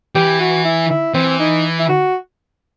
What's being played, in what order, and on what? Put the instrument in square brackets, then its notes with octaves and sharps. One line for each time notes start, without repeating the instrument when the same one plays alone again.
[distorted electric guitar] E3 [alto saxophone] G4
[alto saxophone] F#4
E4
E4
[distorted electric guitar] E3 [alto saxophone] C4
[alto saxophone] D#4
E4
F#4